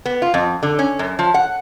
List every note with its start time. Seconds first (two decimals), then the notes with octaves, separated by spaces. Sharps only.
0.06 B3
0.22 F4
0.34 F2
0.63 D3
0.79 C#4
0.99 F#2
1.19 F3
1.34 F#5